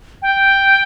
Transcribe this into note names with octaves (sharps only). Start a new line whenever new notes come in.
G5